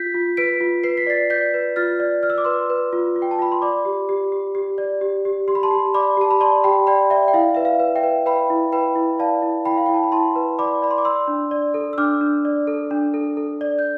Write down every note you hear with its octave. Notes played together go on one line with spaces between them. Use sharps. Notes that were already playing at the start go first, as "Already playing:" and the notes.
Already playing: F4 G6 B6
F4
B4 B6 D7
F4
B4 C7
B6
D5 A6 C7
D5 G6 B6
B4
F4 F6 A6
D5
D5 F6
E6
D6
B4 C6 E6
B4
F4
F4
G5
A5
F4 B5
C6
D5 B5 D6
G4
G4
G4
G4
D5
G4
G4
G4 C6
B5
A5 C6
G4
D5 B5 D6
G4 A5
B5
D5 A5 C6
G4 G5 B5
D5 G5 B5
D5 E5 G5
G5
E4 F5
B4 E5
F5
B4
E5 G5
B4
B4 G5 B5
E4
B4 G5 B5
E4
D5 F5 A5
E4
E4 G5 B5
F5
E4 G5
A5
B5
E4 A5 C6
B4
D5 B5 D6
D5 B5
C6
D6
D5 C6 E6
D4
D5
A4
E6
D4 D6 F6
D4
D5
A4
D4
A4
A4
D5
G6